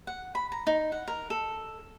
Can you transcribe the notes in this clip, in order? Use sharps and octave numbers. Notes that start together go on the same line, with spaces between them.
F#5
B5
A#5
D#4
F#5
A#4
A4